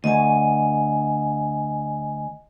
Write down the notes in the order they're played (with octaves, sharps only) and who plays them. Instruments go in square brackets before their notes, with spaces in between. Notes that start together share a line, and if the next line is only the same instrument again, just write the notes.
[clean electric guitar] D2 [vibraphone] D#5 G#5